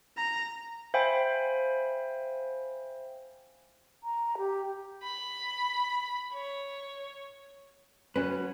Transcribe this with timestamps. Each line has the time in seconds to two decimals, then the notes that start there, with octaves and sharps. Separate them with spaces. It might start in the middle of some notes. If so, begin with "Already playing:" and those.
0.17 A#5
0.94 C5 E5 F5 G5 G#5 B5
4.04 A#5
4.38 G4
5.03 B5
6.33 C#5
8.16 F#3 C#4 B4